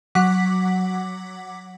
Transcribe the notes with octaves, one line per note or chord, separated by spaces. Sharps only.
F#3 F#5 D6 B6